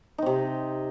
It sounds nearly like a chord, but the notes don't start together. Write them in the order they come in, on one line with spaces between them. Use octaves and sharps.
D#4 C4 C3